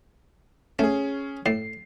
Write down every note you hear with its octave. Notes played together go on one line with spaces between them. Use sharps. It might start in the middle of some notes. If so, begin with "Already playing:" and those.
A3 C#4 G#4
A2 C7